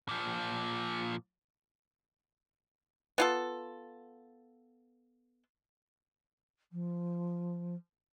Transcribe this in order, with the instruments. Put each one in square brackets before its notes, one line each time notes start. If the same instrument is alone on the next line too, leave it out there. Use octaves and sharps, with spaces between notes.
[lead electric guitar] A#2 F3
[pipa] B3 F4 A4
[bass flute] F3